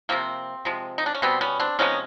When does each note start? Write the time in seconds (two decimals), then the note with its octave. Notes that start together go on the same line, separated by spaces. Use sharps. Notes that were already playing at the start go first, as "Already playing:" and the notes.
0.09 C3 F3 A#3 C4
0.65 C3 F3 G#3
0.98 D#4
1.06 D4
1.15 C#4
1.22 B2 G3 B3 C4
1.41 B3 C#4
1.60 C4 D4
1.79 C3 F3 G#3 B3 C#4 D#4